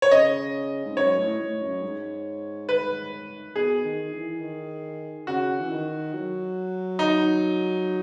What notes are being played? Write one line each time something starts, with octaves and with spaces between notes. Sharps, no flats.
C#5
C#3 D#5
G#2
F#2 C#5
A2
A2
F#2
G#2
B4
B2 G#4
D#3
E3
D#3
C#3 F#4
E3
D#3
F#3
D#4